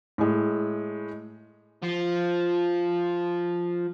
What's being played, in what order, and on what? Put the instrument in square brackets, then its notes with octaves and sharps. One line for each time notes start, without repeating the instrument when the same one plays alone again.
[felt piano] A2 G#3
[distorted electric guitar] F3 F4